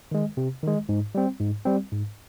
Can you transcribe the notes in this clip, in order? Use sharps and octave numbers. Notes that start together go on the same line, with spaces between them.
D#3 G#3
C3
D#3 G#3
G#2
G3 C4
G#2
G3 C4
G#2